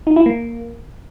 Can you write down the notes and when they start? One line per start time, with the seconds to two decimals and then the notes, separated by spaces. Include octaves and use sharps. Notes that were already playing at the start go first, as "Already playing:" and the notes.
0.07 D#4
0.16 E4
0.26 A#3